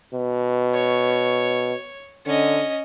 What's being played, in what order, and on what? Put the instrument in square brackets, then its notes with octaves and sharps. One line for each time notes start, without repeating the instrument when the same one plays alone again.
[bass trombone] B2
[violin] C#5
[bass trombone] D3 [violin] C#4 D#5